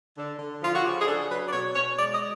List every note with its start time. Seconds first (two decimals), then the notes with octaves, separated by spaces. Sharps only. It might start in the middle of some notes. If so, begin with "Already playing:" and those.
0.17 D3
0.39 D3
0.63 F3 F4
0.75 F#4
0.85 C#3 G4
1.01 G#4
1.07 D4 A4
1.30 F#3 B4
1.47 D5
1.52 B2 C#5
1.75 B2 C#5
1.98 G#3 D5
2.13 D#5